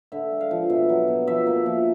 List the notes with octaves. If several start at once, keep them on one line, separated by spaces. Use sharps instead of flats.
D3 E5
G#3
F5
F3
B2 E5
F#3
B2
F3 E5
A#3
F3